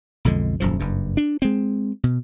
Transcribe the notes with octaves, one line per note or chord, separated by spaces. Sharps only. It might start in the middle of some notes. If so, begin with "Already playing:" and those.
B1 F2 D3 G#3
D#1 F#2 F3
F#1 G2
D4
G#3 C4
B2